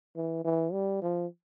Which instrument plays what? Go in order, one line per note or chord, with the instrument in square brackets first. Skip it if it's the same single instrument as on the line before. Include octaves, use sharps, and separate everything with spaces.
[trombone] E3
E3
G3
F3